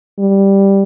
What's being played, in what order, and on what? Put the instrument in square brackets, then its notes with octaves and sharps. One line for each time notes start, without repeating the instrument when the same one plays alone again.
[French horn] G3